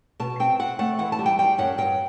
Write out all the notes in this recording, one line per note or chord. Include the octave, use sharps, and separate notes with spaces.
B2 A5
C4 G5
C4 F#5
A3 F#5
E3 F#5
A5
G3
G5
G3 G5
F#2 F#5
G2 G5